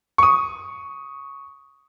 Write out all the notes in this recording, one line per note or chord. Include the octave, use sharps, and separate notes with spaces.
C#6 D#6